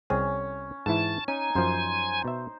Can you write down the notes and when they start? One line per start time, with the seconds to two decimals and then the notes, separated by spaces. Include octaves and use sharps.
0.10 C2 C4 C#4 G#4
0.86 G#2 E3 E4 A5
1.28 C#4 D#4 G#5
1.55 F#2 F3 C5
2.25 B2 E5